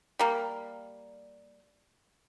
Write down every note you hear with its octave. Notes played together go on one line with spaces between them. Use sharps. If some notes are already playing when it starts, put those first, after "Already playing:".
G3 A#3